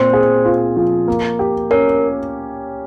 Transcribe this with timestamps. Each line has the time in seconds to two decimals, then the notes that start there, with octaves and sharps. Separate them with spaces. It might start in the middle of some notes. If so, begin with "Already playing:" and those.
Already playing: A#2 C4 C5
0.13 G#4
0.45 F4
0.77 F3
1.08 A#3
1.39 G4
1.71 C#4 A#4